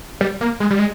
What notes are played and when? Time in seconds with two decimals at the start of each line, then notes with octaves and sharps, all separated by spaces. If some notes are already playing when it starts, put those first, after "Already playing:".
0.21 G3
0.41 A#3
0.60 G#3
0.70 G3
0.79 G#3